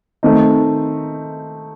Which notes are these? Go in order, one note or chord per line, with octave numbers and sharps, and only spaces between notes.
D#3 A3 C4 D#4